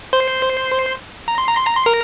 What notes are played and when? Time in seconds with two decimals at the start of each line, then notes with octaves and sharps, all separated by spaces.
0.13 C5 C6
1.28 A#5
1.38 C6
1.47 A#5
1.57 C6
1.67 A#5
1.76 C6
1.86 A#4 A#5